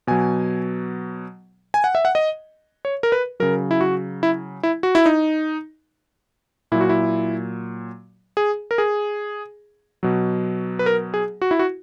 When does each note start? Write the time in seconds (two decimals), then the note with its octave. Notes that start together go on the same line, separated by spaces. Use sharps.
0.07 B2 F#3 G#5
1.74 G#5
1.84 F#5
1.95 E5
2.05 F#5
2.15 D#5
2.85 C#5
3.03 A#4
3.12 B4
3.40 C#3 F#3 A#4
3.71 E4
3.81 F#4
4.23 E4
4.63 E4
4.83 F#4
4.95 E4
5.06 D#4
6.72 A#2 F#3 E4
6.81 F#4
6.89 E4
8.37 G#4
8.71 A#4
8.78 G#4
10.03 B2 F#3
10.79 B4
10.86 A#4
11.14 G#4
11.42 F#4
11.51 E4
11.59 F#4